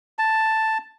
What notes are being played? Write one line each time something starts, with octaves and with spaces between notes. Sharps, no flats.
A5